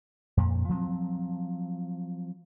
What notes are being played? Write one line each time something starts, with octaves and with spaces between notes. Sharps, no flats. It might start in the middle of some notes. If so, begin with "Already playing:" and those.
F2 A#2
F3 F#3 A#3 C4